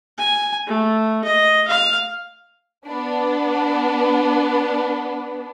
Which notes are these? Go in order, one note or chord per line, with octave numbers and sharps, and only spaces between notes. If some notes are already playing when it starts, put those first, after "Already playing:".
G#5
A3
D#5
F5
B3 D4